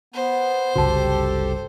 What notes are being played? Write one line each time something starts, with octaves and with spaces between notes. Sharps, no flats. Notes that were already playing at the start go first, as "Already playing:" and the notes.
B3 C5
F#1 C2 C#3 F#4 G4 A4 A5